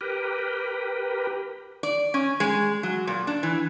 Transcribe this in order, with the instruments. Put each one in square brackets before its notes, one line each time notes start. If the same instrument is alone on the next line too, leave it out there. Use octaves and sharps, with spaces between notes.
[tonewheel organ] G4 A#4 B4
[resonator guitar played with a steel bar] D5
C#4
G#3
F#3
A#2
D4
E3